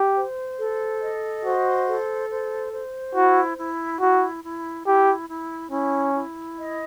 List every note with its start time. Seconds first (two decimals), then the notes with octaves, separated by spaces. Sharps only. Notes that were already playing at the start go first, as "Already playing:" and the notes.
Already playing: G4
0.16 C5
0.58 A4
1.01 D#5
1.44 F#4 C5
1.87 A4
2.29 C5
2.72 C5
3.15 E4 F#4
3.58 E4
4.01 E4 F#4
4.43 E4
4.86 E4 G4
5.29 E4
5.71 C#4 E4
6.15 E4
6.58 D#5